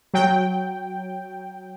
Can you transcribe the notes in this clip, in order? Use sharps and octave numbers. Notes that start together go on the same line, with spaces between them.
F#3 G5